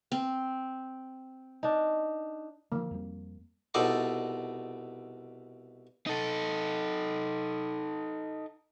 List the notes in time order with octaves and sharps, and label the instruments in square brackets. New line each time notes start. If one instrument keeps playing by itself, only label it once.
[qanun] C4
[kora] D4 D#4
[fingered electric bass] D3 F3 [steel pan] A#3
[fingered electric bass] F2 G3 C4
[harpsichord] C2 B2 D#4 A4 D5 C6
[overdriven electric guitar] D#4 A4